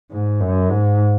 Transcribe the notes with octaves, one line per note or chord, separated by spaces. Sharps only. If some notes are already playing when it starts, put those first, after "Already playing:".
G#2
F#2
G#2